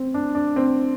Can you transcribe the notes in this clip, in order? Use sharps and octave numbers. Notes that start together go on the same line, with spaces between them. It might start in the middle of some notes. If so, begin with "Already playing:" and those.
Already playing: C4
D4
D4
C4